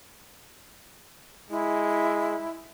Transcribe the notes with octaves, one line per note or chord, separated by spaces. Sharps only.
G#3 E4